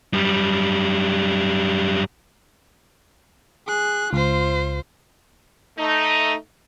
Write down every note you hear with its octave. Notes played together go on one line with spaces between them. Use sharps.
F#2 G3
G#4 F#6
C#2 F4 C5
A3 D#4